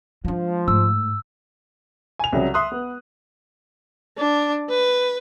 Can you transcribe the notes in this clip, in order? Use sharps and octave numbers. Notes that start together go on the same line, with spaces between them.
F3 G#3 D4
G#2 A3 E6
G#5 F7
C2 C#3 F#3
E5 C6 D#6 F#6
B3
D4
B4